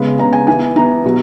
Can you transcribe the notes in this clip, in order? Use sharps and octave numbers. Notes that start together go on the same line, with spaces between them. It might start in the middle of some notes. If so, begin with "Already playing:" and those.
Already playing: C#3 G#3 B3 B5
C#3 G#3 B3 A#5
G#5
E3 B3 G#5
E3 B3 A#5
B2 F#3